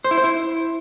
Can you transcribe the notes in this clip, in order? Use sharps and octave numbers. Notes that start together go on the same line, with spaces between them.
C5
E4
C5
E4